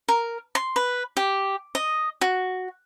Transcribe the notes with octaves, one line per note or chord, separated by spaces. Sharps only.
A#4
C6
B4
G4
D#5
F#4